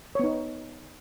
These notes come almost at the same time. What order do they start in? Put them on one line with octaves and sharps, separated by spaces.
C#5 B3 D#4